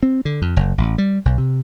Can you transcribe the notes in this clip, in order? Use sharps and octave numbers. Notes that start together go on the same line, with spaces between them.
C4
D3
F2
F#1
A1
G3
B1
C3